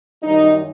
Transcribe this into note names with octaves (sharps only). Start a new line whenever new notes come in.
F#2 D#3 G3 D#4